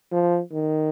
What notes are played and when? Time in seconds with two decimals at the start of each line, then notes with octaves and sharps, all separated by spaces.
0.12 F3
0.52 D#3